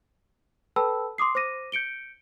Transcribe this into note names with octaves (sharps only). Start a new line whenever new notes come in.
A4 B4 G5 A5 B5 E6
C6 D6 D#6 C7
C5 D6 A#6 D#7
G6 C#7 D7 G7